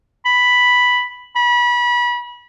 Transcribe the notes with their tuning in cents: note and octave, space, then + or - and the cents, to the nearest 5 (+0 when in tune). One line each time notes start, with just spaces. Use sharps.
B5 +0
B5 -30